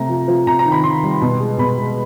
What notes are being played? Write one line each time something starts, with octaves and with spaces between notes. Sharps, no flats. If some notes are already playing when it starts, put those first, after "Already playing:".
Already playing: C3 A3 A#5
F3
F3
C3 A#5
A#5
D#3
B5
D#3 C6
G3
B2
G#3
B2 B5
G#3